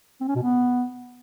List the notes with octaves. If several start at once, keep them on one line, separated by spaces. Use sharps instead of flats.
C4
C#4
B2
B3